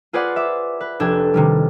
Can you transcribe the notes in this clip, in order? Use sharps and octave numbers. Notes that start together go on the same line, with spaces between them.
F4 G#4 B4 C5 D5 F#5
E5 D6
B4
F1 D4 G4 A4 G#6
C3 D#3 G3